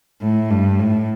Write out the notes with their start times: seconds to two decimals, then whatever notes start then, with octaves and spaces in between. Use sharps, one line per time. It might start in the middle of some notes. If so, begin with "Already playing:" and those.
0.22 A2
0.51 G2
0.80 A2